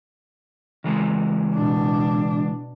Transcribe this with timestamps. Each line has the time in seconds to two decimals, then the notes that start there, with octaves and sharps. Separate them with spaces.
0.84 C#3 E3 G#3
1.54 B2 D4